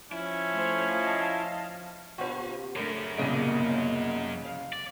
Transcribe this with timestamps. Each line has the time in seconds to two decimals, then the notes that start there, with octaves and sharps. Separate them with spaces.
0.12 F3 C#4 E4
0.53 A3 C5 C#5
0.99 D#5 F5 A5
2.18 C3 A#3 F4
2.76 F#2 C#3 A3 D4 A#4
3.18 C2 A#2 C#3 G#3 A#3 B3 D#5 D7
4.45 F5
4.73 D5